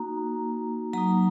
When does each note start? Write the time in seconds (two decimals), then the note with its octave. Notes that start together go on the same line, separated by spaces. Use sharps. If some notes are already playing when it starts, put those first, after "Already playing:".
Already playing: A#3 D#4 F#4 A#5
0.93 F#3 A#3 D#4 A#5